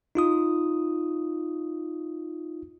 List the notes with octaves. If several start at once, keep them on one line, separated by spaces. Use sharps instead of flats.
D#4 F4 D#6